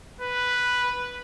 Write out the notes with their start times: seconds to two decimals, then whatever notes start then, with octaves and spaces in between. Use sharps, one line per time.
0.21 B4